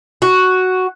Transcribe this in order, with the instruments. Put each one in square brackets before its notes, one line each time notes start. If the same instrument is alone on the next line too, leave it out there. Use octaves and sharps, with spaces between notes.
[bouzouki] F#4